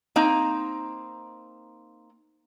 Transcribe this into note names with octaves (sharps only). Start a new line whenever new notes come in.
A#3 C4 D#4 A#5